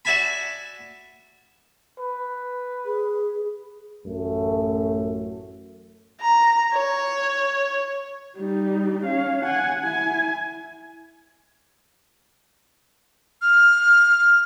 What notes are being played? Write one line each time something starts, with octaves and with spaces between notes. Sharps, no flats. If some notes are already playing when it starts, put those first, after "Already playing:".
F#4 D5 E5 G#5 A5 B5
B4
G#4
A1 F#2 A3
A#5
C#5
G3 D#4
C#4 F5
F#5 G#5
E4 G#5
F6